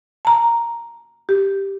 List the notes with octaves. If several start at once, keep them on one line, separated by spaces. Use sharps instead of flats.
A5 A#5
G4